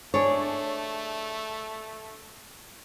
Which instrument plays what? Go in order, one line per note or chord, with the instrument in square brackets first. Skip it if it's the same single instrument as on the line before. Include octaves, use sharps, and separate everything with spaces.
[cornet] A3 [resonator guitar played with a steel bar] D4 G#4 [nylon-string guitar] C#5